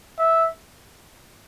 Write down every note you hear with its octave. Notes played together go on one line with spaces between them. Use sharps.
E5